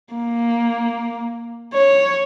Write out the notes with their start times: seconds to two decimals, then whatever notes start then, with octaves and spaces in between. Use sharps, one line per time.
0.15 A#3
1.73 C#5